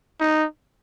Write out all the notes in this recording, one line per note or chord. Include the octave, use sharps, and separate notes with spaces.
D#4